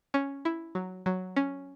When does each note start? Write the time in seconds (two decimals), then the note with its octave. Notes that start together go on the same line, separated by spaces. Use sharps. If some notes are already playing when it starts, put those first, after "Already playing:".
0.14 C#4
0.45 E4
0.75 F#3
1.06 F#3
1.36 C#4